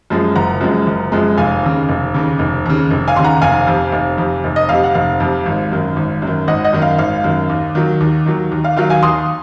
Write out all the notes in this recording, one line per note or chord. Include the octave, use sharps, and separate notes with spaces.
F#2 F3 G#3
F#1 F#5 A#5
F#2 F3 G#3
F#1
F#2 F3 G#3
F1 F5 G#5
D#2 C#3
F1
D#2 C#3
F1
D#2 C#3
F1
F5 G#5
D#2 C#3 C6
F#5 A#5
F1 F5 G#5
F2 C3
F1
F2 C3
F1
D#5
F2 C3 F5
F#5
F1 F5
F2 C3
G#1
F#2 D#3
G#1
F#2 D#3
G#1 D#5 F#5
D#5 F#5
F#2 D#3
F5
G#1 F5
F#2 D#3
D#2
D#3 F#3
D#2
D#3 F#3
D#2
F5
D#3 F#3 F5
F5 G#5
D#2 C6 D#6